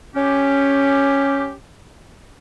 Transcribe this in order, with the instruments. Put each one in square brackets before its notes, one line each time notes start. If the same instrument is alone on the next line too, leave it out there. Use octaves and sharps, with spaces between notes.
[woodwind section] C#4 G4